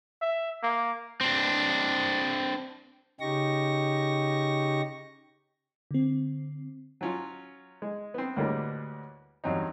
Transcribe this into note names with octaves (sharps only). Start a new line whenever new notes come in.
E5
A#3
C4 D4
C#3 D#4 G4 C#6 A#6
D3 C4
F#3 C#4 F4
G#3
B3 C4
D2 A2 G3 G#3 A#3 B3
E2 G2 F#3 C4 D#4